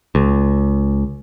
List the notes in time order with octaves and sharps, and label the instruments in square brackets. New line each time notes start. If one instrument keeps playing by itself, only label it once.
[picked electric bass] C#2